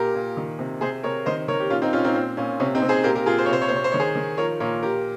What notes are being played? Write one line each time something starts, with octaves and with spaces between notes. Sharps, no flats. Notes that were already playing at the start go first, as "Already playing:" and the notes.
Already playing: A#2 G4 A#4
A#2
D#3
C3
C3 G#4 C5
C3 A#4 C#5
D#3 C5 D#5
D#3 A#4 C#5
G4
A#2 C#4 F4
C4 D#4
A#2 C#4 F4
C4 D#4
A#2 C4
A#2 C#4
C3 C#4
C4 D#4
C3
G#4 C5
A#2 G4 A#4
G4 A#4
A#2 F4 G#4
C5
C#5
C3 C5
C#5
C3 C5
C#5
C5
D#3 C#5
G#4 C5
D#3
F3 A#4 C#5
A#2 A#4 C#5
A#2 G4 A#4